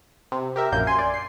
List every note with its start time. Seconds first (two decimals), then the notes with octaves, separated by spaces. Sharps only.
0.32 C3
0.56 G4 A#4 E5
0.72 A#1 F#2 A#3 G6
0.87 G#5 C6
0.99 D5
1.14 C7